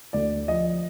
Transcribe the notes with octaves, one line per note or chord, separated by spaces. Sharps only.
D2 D5
F3 D#5